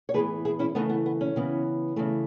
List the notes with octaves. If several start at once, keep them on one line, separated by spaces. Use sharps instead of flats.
C#5
A2 E3 B3 G#4 B4
E4 G#4
C#4 E4
C#3 E3 A3 B3 D#4
B3
B3
C#4
C#3 E3 B3
C#3 E3 A3